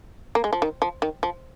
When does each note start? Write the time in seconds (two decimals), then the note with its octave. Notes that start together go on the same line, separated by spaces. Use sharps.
0.35 A#3
0.44 G#3
0.53 F3
0.62 D#3
0.82 F3
1.02 D#3
1.23 F3